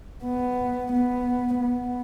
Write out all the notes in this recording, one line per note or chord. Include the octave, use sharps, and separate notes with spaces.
B3
B3
B3